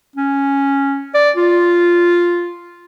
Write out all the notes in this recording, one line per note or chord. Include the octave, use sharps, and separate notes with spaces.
C#4
D5
F4